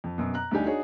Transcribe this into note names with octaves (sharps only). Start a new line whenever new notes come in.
F2
F#2 B2
A#5 F#6
D2 G3 D4 D#4 G4 G#5
D4 D#4 F#4 G#4 C#5